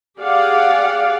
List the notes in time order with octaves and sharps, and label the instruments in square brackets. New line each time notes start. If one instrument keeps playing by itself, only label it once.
[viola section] G4 G#4 D5 F5 F#5